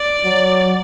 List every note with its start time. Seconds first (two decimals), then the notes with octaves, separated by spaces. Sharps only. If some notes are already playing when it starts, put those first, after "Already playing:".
Already playing: D5
0.24 F#3